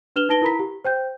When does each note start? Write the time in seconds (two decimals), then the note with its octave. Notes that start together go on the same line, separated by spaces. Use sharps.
0.16 D4 B4 F6 E7 F7 G7
0.29 D#4 B4 A5 A#6 D7 G7
0.42 E4 A#4 A#5 B5 B6
0.59 G4
0.85 C5 G5 G6